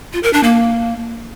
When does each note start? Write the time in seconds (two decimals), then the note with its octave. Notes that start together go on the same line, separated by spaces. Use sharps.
0.13 F4
0.23 A#4
0.33 D4
0.43 A#3